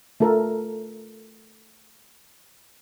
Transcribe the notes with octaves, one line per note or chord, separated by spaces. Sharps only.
A3 F4 A4 A#4